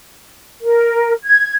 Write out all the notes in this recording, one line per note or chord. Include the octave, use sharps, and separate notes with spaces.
A#4
G#6